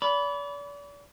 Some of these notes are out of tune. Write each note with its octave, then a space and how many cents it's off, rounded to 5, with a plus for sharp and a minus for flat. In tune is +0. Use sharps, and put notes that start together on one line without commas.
D5 -40 B5 +0